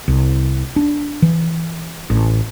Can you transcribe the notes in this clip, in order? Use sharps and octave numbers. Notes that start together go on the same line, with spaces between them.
C2
D4
E3
A1